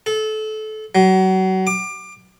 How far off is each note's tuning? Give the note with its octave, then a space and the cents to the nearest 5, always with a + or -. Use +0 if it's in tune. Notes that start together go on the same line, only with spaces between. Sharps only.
A4 -25
F#3 +30
D6 +25